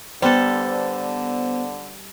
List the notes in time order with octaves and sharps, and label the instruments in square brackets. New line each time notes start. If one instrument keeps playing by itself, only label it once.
[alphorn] D3 [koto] G3 A4 [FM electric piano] B3 C5